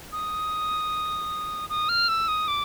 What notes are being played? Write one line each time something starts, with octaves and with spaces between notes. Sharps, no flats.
D#6
D#6
F6
E6
D#6
D6